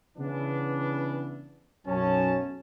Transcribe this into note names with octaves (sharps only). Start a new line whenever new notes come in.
C#3 E3 B3 D4
B1 F#2 C#4 A5